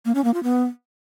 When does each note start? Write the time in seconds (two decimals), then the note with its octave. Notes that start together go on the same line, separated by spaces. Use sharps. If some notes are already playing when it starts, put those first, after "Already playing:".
0.05 A#3
0.15 C#4
0.24 A#3
0.34 F4
0.43 B3